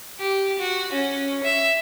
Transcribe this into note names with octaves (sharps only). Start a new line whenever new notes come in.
G4
F#4
C#4
E5